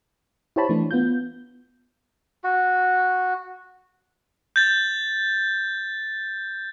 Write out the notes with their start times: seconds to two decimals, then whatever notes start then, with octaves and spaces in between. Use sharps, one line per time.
0.56 E4 G4 C5 C#5 A5 B5
0.69 E3 A3 D4
0.91 B3 F4 G6
2.44 F#4
4.56 G6 A6